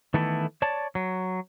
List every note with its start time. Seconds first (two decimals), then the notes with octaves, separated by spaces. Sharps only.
0.14 D#3 E3 A3 B3 E4 A4
0.62 C#5 D5 A5
0.95 F#3